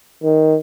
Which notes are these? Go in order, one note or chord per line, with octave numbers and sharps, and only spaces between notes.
D#3